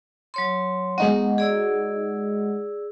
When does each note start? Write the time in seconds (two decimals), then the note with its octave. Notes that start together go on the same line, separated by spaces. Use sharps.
0.34 F#3 C#5 C6
0.98 G#3 B3 D#4 F#4
1.38 G#4 D5 E6